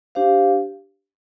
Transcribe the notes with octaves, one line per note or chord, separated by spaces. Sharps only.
D4 G4 C5 F5